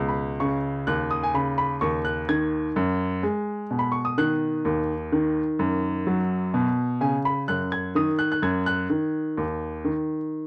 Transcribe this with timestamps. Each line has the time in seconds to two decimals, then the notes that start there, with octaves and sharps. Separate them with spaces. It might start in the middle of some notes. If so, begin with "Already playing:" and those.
Already playing: C#2 B2
0.09 B5
0.40 C#3 C#6
0.87 D#2 F#6
1.11 D#6
1.23 G#5
1.34 C#3 B5
1.58 B5
1.81 D#2 C#6
2.05 F#6
2.29 D#3 G#6
2.76 F#2
3.23 G#3
3.71 B2
3.79 B5
3.92 C#6
4.05 D#6
4.18 D#3 F#6
4.65 D#2
5.12 D#3
5.59 F#2
6.07 F#3
6.54 B2
7.01 C#3 G#5
7.25 B5
7.48 F#2 F#6
7.72 G#6
7.95 D#3 D#6
8.19 F#6
8.32 F#6
8.42 F#2 G#6
8.66 F#6
8.90 D#3
9.37 D#2
9.85 D#3